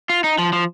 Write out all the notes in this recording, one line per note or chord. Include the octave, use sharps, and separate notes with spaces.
F4
D#4
F3
F3